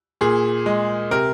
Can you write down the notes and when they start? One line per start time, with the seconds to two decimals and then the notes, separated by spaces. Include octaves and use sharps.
0.21 A#2 G#4
0.66 G#3
1.11 C3 A#4